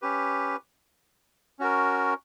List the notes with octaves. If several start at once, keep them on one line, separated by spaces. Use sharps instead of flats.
C#4 G4 B4
C#4 F#4 A#4